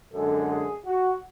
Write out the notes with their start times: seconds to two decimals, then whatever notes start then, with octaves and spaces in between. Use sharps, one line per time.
0.13 F#2 D3 G#3 A4
0.50 G#4
0.86 F#4